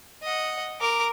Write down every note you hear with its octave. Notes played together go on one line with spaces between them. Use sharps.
D#5 F#5
A#4 D6